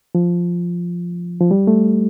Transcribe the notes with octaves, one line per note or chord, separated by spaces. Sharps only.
F3
F3
G3
A3